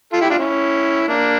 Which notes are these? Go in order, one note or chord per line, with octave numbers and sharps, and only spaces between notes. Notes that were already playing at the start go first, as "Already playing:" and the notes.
F4 A4
E4 G4
D4 F4
C#4 E4
A#3 D4